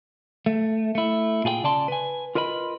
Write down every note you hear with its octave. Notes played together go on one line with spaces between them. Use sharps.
A3
A3 E4
A#2 F4 G#4 B4 G5
C#3 D5 A5 C6
B4 G#5
F4 A#4 B4 D#5 B5